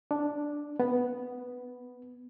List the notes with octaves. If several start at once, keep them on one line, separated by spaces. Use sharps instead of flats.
D4
B3